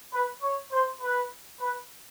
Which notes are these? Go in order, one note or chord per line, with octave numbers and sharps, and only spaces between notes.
B4
C#5
C5
B4
B4